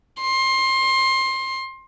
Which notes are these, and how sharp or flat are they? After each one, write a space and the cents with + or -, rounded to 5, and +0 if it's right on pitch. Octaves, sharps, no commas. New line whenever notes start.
C6 +25